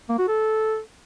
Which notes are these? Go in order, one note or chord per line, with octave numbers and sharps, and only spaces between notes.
A#3
F#4
A4